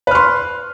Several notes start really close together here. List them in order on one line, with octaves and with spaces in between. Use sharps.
B4 F6 C6